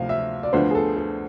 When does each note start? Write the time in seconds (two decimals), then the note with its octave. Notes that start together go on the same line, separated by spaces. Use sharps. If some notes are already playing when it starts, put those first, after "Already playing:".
Already playing: D2 C3 F3 F5
0.09 E5
0.43 D5
0.53 D2 D3 F3 B3 C5
0.71 G#4
0.75 A4
0.96 A4